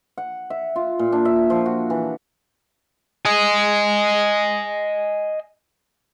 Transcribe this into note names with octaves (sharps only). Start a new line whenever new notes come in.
F#5
E5
F4
A#2
D4
E5
F3
F#4
E3
D#5 G#5